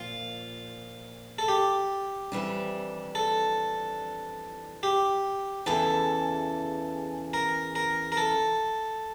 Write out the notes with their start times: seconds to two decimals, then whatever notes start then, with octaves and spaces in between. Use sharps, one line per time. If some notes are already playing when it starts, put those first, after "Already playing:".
Already playing: A#2 F3 A#3 F4
1.39 A4
1.48 G4
2.32 F2 E3 G3 D4
3.15 A4
4.83 G4
5.66 E2 C#3 E3 A4
7.33 A#4
7.75 A#4
8.12 A#4
8.17 A4